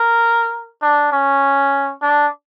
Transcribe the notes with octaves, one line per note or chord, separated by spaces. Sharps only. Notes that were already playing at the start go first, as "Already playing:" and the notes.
Already playing: A#4
D4
C#4
D4